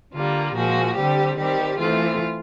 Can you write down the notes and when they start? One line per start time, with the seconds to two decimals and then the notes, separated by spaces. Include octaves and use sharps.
0.13 D3 G3 A#3 F4
0.55 A#2 F3 G#3 F#4
0.95 D3 G3 C4 G4
1.37 D#3 G3 C4 G4
1.78 E3 A3 C4 F4